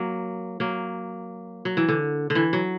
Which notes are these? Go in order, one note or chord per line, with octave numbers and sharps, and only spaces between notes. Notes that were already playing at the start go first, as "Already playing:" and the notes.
Already playing: F#3 A#3
F#3 A#3
F#3
E3
D3
D3
E3
F#3